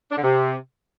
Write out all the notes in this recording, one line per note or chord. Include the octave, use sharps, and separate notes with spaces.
D4
D3
C3